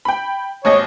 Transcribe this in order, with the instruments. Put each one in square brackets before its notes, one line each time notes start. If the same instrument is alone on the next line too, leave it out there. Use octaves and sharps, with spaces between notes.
[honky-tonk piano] G5 B5
[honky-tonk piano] G#1 D#2 D#5 [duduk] C#5